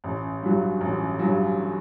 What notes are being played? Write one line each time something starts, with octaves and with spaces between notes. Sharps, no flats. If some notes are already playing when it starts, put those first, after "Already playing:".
A1
G2 F#3
A1
G2 F#3